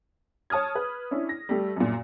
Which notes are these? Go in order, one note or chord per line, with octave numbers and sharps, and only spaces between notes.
C#5 A5 D#6 F6 G#6
B4
C#4 D4 E4
A#6
G3 A3
F#2 A#2